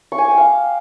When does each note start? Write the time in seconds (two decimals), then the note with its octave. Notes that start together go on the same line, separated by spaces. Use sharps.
0.12 C#6
0.18 G#5
0.25 D6
0.31 G5
0.37 F5